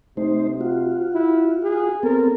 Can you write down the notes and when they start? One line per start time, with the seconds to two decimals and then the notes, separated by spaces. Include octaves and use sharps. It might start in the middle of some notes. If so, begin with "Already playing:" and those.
0.17 C3 A3 D#4 C5
0.61 F4 F#4
1.14 E4
1.63 G#4
2.03 B3 C4 A4 A#4